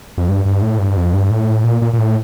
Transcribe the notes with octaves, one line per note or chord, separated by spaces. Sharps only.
F2
G2
G2
A2
G2
F2
G2
A2
A#2
A#2
A#2
A2